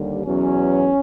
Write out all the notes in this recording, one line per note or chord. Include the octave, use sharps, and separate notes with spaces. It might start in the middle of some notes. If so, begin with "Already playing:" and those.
Already playing: D#2 D3 G3
E2 B2 F#3 C#4